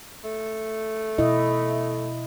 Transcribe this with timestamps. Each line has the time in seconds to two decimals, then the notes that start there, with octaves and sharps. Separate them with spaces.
0.24 A3
1.18 B2 E4 D#5